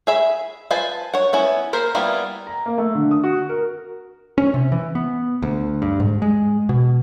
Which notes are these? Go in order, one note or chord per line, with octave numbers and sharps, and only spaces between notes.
G#4 E5 B5
F4 B4 C5 G#5 A5
C#5 F#5
B3 C#4 E4
A#3 A#4 C5 B5
G3 A#3 B3 E4 F4
A#5
A#3
A3
D3
D#6
F#4
A#4
C#4
C3
E3
B3
D2
G2
G#2
G#3
B2